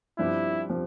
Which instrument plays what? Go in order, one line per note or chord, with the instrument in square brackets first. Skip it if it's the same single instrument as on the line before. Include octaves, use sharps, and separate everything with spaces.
[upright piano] G2 F3 C4 G4 [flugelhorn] E4
[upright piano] F3 C4 G4